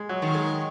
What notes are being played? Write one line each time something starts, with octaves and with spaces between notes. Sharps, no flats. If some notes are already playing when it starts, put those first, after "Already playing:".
Already playing: G#3
F#3
D#3
G#3